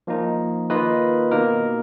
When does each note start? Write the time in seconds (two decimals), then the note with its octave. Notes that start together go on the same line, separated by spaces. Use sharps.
0.07 F3 A#3 D#4
0.70 D#3 A#3 F4 B4 D#5
1.31 B2 A#3 D#4 A#4